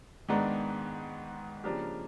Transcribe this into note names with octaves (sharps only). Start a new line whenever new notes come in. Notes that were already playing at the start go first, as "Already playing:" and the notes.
G#2 D#3 G#3 B3 D4
C#3 F3 A#3 D4 G4